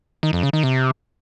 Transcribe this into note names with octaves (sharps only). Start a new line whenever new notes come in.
D#3
F2
C#3
D#3
C3